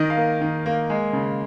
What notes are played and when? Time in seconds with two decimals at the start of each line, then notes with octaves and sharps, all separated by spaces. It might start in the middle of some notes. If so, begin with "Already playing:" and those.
Already playing: D#3 D#5
0.10 F5
0.17 A#3
0.41 D#3
0.66 A#3
0.90 G#3
1.13 C#3